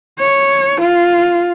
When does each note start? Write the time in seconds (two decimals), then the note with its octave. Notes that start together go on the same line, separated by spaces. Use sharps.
0.19 C#5
0.81 F4